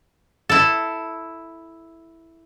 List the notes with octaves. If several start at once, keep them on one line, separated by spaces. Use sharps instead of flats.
E4 A4